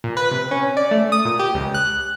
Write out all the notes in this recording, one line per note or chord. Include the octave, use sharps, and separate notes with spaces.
A#2
B4
C3
C#4
D5
A3
D#6
A#2
G4
C#2
F#6